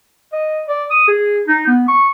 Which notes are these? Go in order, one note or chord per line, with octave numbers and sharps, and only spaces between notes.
D#5
D5
D#6
G#4
D#4
B3
C#6